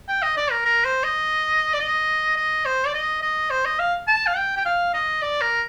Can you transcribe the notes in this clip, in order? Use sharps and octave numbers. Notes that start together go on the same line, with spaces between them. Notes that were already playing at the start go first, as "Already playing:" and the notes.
G5
D#5
D5
A#4
A#4
C5
D#5
D5
D#5
D#5
C5
D5
D#5
D#5
C5
D#5
F5
A5
F5
G5
G5
F5
D#5
D5
A#4